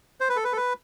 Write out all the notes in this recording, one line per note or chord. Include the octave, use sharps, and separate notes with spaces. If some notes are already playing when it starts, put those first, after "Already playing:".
C5
B4
A4
B4
A4
B4